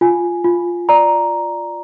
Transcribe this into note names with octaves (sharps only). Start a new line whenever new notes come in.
F4 G#5
F4
D5 A#5